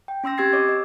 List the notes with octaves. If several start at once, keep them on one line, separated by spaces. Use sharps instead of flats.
G5
C#4 C6 E6 A#6
C4 G4 E6 G#6 A6 C7
C#5 D#5 D6
D#5